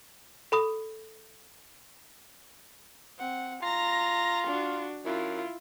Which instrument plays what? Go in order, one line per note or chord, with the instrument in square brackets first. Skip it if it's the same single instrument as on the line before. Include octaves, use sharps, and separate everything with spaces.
[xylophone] A4 B5 D#6
[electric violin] C4 F#5
[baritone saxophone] F4 [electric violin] A#5 A#6
[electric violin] D4 F#4
[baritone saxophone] F#2 [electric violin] E4 F4